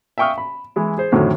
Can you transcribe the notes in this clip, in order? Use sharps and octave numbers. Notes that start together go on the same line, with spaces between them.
E5 F5 G5 C#6 D#6 F6
B5
E3 G#3 E4
G#4 C5
F2 A2 D3 D#3 F#3